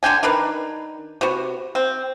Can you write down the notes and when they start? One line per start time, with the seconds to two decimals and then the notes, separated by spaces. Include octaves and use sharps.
0.03 D3 D4 G5 G#5
0.23 D#3 D4 A#4 B4
1.21 C3 B3 F#4
1.75 C4